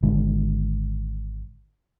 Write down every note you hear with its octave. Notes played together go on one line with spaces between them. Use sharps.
G#1 D3 G#3